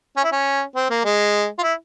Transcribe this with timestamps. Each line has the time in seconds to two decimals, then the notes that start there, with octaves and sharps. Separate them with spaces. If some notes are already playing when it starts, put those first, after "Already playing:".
0.17 C#4
0.24 E4
0.32 C#4
0.76 C4
0.90 A#3
1.05 G#3
1.59 F4
1.63 E4